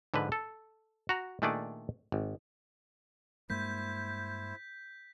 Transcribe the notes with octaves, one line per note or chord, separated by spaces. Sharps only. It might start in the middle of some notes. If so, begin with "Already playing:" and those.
G#2 D3 F3 B4
A4
F#4 A#5
A#2 D#3 A3 D4 G#4 D5
G#1
G2 G#3 A#3 E4 C5 G6 B6